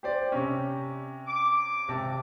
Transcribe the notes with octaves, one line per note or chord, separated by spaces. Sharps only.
G4 C5 D5
C3 C#4
D6
G#1 C3 A5